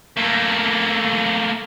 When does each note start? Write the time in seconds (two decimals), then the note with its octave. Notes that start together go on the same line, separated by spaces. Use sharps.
0.17 A3 A#3